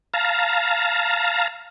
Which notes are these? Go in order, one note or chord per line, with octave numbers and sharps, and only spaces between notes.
F5 A5 A#5